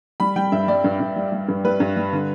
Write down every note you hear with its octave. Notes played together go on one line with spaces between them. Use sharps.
G3 B5
G3 G5
G2 E5
G3 D5
G2
G2
G3
G3
G2
G3 B4
G2
G3
D3